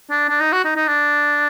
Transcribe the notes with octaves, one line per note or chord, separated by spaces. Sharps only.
D4
D4
D#4
F#4
D#4
D#4
D4